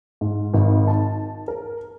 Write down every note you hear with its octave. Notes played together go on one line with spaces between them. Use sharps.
G#2
G#1
A5
A#4